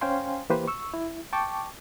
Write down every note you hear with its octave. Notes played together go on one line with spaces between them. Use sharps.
C#4 C5 F5 G5 G#5 C6
E3 A#3 G4 B4 C5
C#6 E6
E4
G5 A5 C#6 D6